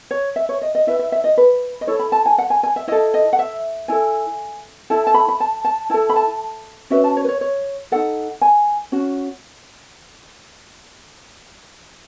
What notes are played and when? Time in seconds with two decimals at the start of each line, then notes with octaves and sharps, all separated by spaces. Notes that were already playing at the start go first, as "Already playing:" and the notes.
0.11 C#5
0.36 E5
0.49 C#5
0.62 D#5
0.75 D#5
0.87 E4 B4 E5
0.99 E5
1.12 E5
1.24 D#5
1.37 B4
1.81 D#5
1.87 E4 A4 C#5
1.99 B5
2.12 A5
2.26 G#5
2.38 F#5
2.50 G#5
2.63 G#5
2.76 E5
2.88 E4 A4 D#5
3.14 D#5
3.33 F#5
3.39 E5
3.88 E4 A4 G#5
4.90 E4 A4 A5
5.07 A5
5.14 B5
5.29 B5
5.40 A5
5.65 A5
5.90 E4 A4 A5
6.09 B5
6.16 A5
6.90 C#4 F#4 B4 E5
7.04 A5
7.17 C#5
7.24 B4
7.28 C#5
7.41 C#5
7.92 D#4 F#4 A4 F#5
8.41 G#5
8.92 C#4 F#4